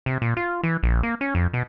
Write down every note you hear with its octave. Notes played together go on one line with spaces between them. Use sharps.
C3
A#2
F4
E3
A#1
A#3
C#4
F2
B2